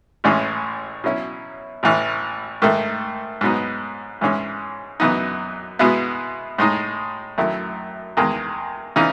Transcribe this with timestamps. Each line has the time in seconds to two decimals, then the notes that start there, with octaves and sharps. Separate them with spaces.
0.24 A1 A2 E3 G#3 C#4
1.04 B2 F#3 C#4 E4
1.83 A1 A2 E3
2.62 G#2 D#3 A3
3.41 G#2 F#3 B3 D#4
4.21 G#2 E3 G#3 C#4
5.00 F#2 E3 B3 D#4
5.79 B2 G#3 B3 E4
6.58 A2 G#3 D#4
7.38 F#2 D#3 A3 E4
8.17 E2 D#3 G#3
8.96 C#3 E3 D#4